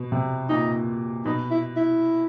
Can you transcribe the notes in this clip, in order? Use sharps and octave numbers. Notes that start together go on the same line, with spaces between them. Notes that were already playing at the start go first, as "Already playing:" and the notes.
Already playing: B2
C3
A#2 D#4
B2 D#4
E4
E4